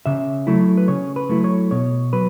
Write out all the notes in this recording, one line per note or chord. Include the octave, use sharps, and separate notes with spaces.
C#3 E5
F#3 A3 E4
B4
C#3 C#5
B4
F#3 A3 E4
C#5
B2 C#5
F#3 B4